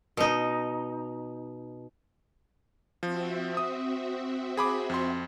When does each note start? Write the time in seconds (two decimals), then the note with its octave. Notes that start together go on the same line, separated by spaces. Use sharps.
0.17 B2 D#4
3.03 F3 C4 F#4 E5
3.57 D#6
4.57 G#4 B5 D6
4.90 F2 C6